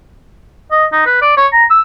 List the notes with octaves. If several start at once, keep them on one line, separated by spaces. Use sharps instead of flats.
D#5
D#4
B4
D5
C#5
A#5
E6